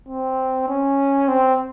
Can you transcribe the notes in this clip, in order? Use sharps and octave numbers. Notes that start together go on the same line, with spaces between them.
C4
C#4
C4